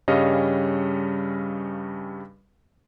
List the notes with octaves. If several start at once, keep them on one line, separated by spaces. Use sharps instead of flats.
G2 C#3 G3 C#4 D#5 F5